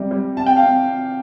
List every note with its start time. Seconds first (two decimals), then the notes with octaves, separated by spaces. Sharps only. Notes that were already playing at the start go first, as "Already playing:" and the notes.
Already playing: C3 G3
0.11 G3
0.37 C3 A5
0.46 G5
0.56 F5
0.63 C3